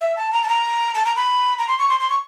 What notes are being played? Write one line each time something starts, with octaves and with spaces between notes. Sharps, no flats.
E5
A5
A#5
A5
A#5
A5
A#5
B5
A#5
C6
C#6
C6
C6
C#6